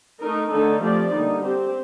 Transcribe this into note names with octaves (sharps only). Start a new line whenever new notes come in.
A3 D#4 A#4
D3 A3 D#4 A4
F3 A3 C4 G4 D5
D3 G3 A#3 D#4
C4 G4 C5